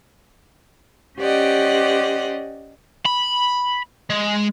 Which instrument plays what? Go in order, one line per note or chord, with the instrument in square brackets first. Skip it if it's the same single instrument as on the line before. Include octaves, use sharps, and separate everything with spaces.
[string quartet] C#4 G4 C5 D5 D#5 F#5
[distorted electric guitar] B5
G#3